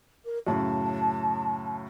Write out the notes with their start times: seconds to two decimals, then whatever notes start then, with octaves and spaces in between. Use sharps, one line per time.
0.25 A#4
0.47 F#2 A2 C#3 A5